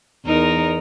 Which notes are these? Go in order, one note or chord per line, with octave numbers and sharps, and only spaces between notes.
E2 D#4 A#4